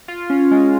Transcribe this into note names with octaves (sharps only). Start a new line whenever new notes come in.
F4
C#4
G#3